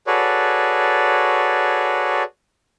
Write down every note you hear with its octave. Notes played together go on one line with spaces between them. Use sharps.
F#4 G#4 A4 B4 C#5 D5